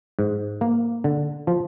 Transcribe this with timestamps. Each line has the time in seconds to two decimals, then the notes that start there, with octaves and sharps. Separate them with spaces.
0.19 G#2
0.61 A#3
1.04 D3
1.47 F3